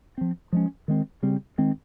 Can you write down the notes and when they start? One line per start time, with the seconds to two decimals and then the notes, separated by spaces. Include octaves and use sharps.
0.18 F3 C4
0.53 F3 G#3 C#4
0.88 D#3 G#3 C4
1.23 C#3 G3 C4
1.58 D#3 G#3 C4